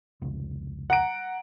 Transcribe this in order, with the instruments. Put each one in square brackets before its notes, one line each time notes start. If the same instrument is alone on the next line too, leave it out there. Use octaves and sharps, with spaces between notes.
[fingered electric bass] F1 C#2
[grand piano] F#5 A#5 D7